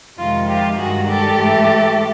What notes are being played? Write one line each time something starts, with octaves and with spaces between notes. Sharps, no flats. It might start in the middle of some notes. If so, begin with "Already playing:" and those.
F2 C3 D#3 G#3 F4
F4 G4
G2 D#3 G#3 F#4 G#4
G4 A4
G#2 E3 A3